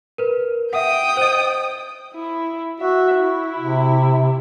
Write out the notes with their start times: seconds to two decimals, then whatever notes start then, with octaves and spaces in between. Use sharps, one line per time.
0.18 A#4 B4
0.73 E5 F#5 G5 D#6
1.17 C5 D#5
2.14 E4
2.81 F#4 E5
3.17 E4
3.59 C3